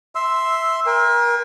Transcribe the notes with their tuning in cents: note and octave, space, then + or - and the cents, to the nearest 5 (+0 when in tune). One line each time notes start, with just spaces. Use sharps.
E5 -5 C6 +0 E6 +0
A#4 +30 G#5 -45